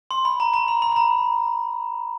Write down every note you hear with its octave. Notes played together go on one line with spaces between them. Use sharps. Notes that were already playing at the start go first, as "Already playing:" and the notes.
C6
B5
A#5
A#5
B5
B5
B5
A#5